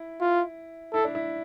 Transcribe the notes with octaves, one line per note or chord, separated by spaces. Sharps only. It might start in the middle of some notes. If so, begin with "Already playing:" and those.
Already playing: E4
F4
E4 A4
D4
E4